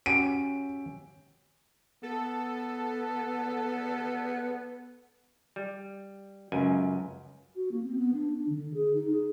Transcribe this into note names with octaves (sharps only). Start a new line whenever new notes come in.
C#4 F#4 G4 D7
B3 A4
G3
C#2 F#2 G#5
F#4
A#3
C4
B3
D4
D4
D3
G#4
D#4
G#4